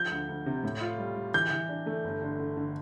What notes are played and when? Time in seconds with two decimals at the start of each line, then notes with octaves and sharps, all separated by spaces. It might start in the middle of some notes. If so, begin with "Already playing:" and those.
Already playing: F3 G6
0.11 D2
0.28 D2
0.46 C3
0.64 A2
0.81 F4
0.98 G3
1.16 G3
1.34 E3 G6
1.51 E3
1.69 D4
1.86 A3
2.05 G1
2.22 D3
2.39 D3
2.57 D3